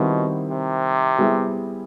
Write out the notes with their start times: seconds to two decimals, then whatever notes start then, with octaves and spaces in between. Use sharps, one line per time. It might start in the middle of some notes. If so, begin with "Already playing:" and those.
Already playing: B2 D#3 G3 C4 E4
0.50 C3
1.19 G3 B3 E4 G#4